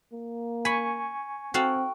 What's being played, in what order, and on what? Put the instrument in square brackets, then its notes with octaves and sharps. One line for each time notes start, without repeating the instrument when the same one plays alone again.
[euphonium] A#3
[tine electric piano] G#5 C#6 [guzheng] B5
[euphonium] C4 [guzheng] F#4 A4 F5 [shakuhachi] G5